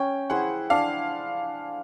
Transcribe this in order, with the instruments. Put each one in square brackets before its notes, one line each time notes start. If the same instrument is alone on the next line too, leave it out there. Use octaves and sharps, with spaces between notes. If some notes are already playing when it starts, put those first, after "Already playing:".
Already playing: [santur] C#4 [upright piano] G5
[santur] E4 G#4 C5 [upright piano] F#5
[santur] D4 [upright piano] F5